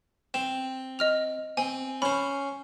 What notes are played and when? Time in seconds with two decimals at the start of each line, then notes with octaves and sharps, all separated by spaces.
0.34 C4 E7
0.99 D#5 F6 F7
1.57 C4 G#5
2.02 C#4 C5 B5